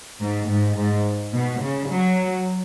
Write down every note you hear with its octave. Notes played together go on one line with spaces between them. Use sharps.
G#2
G#2
G#2
B2
C#3
F#3